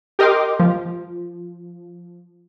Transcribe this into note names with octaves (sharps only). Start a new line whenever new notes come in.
G4 A#4 D#5 G5 C6 D6
F3